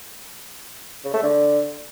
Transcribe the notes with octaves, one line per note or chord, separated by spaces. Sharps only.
C#3
A3
D3